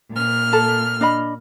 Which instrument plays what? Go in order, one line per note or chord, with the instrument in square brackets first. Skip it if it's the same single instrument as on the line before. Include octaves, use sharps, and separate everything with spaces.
[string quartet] A#2 F6
[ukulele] A4 A5
D4 D#5 B5